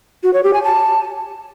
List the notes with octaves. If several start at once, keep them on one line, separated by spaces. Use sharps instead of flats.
F#4
C#5
G4
G#5
A5